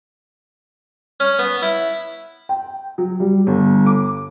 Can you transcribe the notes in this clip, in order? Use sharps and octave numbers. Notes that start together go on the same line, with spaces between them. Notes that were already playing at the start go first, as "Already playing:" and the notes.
C#4
B3
E4
G5
F#3
G3
G1
D6